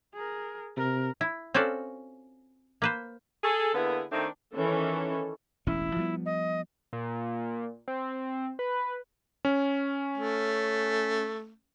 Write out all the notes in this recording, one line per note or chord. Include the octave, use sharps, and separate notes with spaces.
G#4 A#4
C3 A#4
E4
C4 C#4 F4 F#4 A4 D5
A#3 B4 C5
G#4 A4
D3 A#3 B3 E4 G#4
D#3 A3 C4 D4 D#4
D#3 E3 C#4 A4
E1 A1 C#4 E4
F3 G3 B3
D#5
A#2
C4
B4
C#4
A3